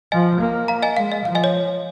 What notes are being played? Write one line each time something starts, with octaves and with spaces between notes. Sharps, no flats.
F3 D#5 G#5
A#3
F5 A#5
D#5 G#5
G#3 F5
D#5
F3 F5
D#5 G#5
C#5